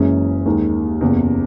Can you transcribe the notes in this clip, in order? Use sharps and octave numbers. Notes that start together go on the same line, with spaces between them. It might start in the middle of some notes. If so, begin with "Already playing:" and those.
Already playing: F#1 F#2 E3 G#3 C#4
D#2 D#3 G#3
F#1 E2 C#3